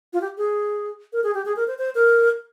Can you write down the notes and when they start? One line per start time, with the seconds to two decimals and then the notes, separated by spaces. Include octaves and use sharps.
0.13 F4
0.21 G4
0.38 G#4
1.13 A#4
1.24 G#4
1.34 G4
1.45 G#4
1.56 A#4
1.68 C5
1.79 C5
1.95 A#4